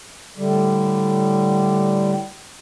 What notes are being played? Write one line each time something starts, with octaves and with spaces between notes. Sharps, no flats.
A2 D3 G3